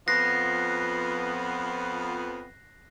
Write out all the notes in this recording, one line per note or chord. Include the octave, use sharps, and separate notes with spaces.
F2 F3 B3 F#6 A#6 C7